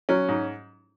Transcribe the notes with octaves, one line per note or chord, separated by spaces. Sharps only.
F#3 C#4
G#2